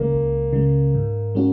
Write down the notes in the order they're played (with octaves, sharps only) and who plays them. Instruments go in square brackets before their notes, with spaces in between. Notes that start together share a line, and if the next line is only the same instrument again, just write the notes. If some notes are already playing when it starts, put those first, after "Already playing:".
Already playing: [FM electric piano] C#2 C#3 G#3 [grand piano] A#3
[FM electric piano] C#2
C#3 G#3
G#2
G#3 C#4 F#4